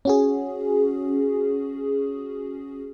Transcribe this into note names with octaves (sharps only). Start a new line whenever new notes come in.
C#4 F#4 G#4